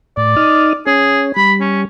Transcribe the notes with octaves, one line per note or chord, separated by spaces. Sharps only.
A2 D5
D#4 D#6 F6
C#4 G#4
G3 B5
C#4